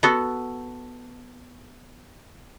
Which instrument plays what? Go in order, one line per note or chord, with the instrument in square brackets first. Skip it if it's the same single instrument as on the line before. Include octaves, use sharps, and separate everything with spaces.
[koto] B3 F#4 A4